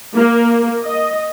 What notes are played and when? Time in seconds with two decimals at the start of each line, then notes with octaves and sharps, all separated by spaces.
0.15 A#3
0.83 D#5